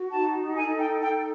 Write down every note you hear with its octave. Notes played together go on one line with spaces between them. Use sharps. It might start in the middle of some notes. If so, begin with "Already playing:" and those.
Already playing: F#4
D#4 A5
A4 G#5
G5
D#4 G5